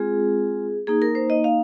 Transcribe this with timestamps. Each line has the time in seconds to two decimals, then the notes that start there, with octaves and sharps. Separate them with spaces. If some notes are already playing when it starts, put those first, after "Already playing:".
Already playing: G#3 C4 F4 G#4
0.87 A#3 D#4 G#4
1.02 A#4
1.15 C5
1.30 D#5
1.44 F5